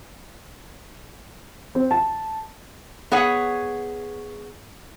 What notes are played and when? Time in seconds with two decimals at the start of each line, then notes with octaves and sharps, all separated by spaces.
1.75 C4
1.91 A5
3.11 B3 G#4 C#5 F#5